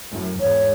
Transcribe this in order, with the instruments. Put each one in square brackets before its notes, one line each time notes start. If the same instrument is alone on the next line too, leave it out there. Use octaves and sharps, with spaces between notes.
[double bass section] F#2 A2
[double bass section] E2 G#2 [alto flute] C#5